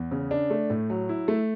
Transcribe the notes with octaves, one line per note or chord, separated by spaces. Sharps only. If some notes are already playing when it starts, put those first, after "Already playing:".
Already playing: E2
C#3
D4
A3
A2
F#3
E4
A3